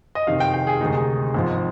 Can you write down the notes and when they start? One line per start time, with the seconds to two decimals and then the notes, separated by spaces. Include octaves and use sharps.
0.15 D#5
0.27 F2 C3 D#3 F5
0.40 G5
0.54 G5
0.67 G#4
0.81 D2 C3 D#3 G#3 D#4
1.34 G#1 G#2 F3